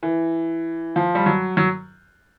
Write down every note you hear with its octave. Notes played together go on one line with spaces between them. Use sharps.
E3
F3
G3
F#3
F#3